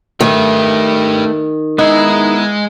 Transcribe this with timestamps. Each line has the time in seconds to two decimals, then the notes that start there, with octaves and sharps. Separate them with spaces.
0.21 D#3 A3 G4 B4
1.79 G#3 B3 D#4 E4